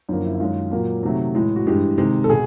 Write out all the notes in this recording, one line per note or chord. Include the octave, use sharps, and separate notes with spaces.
F#2 D3 F3 A#3 D#4
E4
E4
F#2 D#3 G#3 F4
A#2 F#3 A#3
C3 D#3 F#3 A3
A2 E3 G#3
F#4
G2 E3 G#3 G4
C3 D#3 G#3
A4
B2 G#4